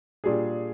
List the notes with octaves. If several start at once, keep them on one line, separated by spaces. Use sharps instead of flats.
A#2 G3 D4 G#4